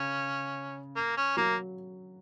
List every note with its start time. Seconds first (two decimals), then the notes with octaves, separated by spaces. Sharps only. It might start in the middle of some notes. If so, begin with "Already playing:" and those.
Already playing: C#3 C#4
0.96 A#3
1.17 C#4
1.37 F#3 A#3